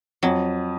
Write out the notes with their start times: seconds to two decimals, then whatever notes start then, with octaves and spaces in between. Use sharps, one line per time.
0.23 F2 F#3